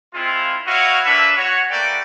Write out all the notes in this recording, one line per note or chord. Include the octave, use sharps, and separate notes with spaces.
G#3 C4 E4 F4
E4 F#4 C#5 D#5 F5 C#6
A#3 D4 B4 E5
F#4 C#5
A3 A#3 F#4 B4 D5 G5